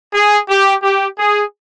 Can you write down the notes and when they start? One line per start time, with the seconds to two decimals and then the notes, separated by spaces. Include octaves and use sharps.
0.13 G#4
0.49 G4
0.83 G4
1.19 G#4